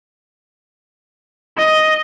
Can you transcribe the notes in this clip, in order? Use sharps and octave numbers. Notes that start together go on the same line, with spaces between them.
D#5